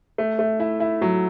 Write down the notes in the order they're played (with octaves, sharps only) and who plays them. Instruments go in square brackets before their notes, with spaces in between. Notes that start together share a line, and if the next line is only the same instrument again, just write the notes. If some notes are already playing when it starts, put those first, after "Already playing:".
[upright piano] A3
A3
E4
E4
[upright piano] F#3 [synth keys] F#4